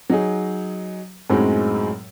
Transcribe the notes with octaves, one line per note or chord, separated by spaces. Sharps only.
F#3 D#4 G#4
F#2 A2 F#3 G#3 C4 D#4